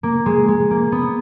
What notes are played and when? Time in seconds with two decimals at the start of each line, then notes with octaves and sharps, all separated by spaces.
0.03 A#3
0.26 G#3
0.48 G#3
0.71 A#3
0.92 B3